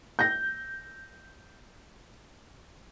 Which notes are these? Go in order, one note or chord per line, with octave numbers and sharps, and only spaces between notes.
G6 A#6